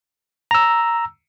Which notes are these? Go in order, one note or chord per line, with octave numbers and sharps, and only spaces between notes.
A#5 E6